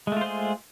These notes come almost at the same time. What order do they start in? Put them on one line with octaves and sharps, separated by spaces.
G#3 A3 F4 C5 G#4